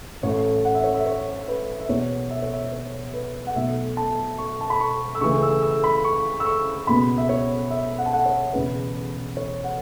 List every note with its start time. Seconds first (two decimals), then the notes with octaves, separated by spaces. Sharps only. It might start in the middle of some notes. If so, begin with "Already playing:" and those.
0.23 A1 A2 A3 C#5
0.65 F#5
0.75 E5
0.84 C#5
0.94 E5
1.06 C#5
1.48 B4
1.80 E5
1.89 E2 B2 B3 C#5
2.31 E5
2.42 C#5
2.54 E5
2.73 C#5
3.14 B4
3.47 F#5
3.56 B1 B2 A3 E5
3.97 A5
4.38 C#6
4.61 A5
4.70 B5
4.80 C#6
5.15 E6
5.21 C#2 C#3 E3 A3 C#6
5.43 E6
5.63 E6
5.84 B5
6.05 C#6
6.40 E6
6.46 C#6
6.87 C#2 B2 B3 B5
7.18 E5
7.29 C#5
7.71 E5
7.98 F#5
8.06 A5
8.13 F#5
8.26 C#5
8.53 E1 E2 C#3 B4
9.37 C#5
9.64 F#5